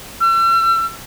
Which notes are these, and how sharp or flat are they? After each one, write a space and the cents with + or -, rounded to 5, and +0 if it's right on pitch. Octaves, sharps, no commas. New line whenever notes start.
E6 +40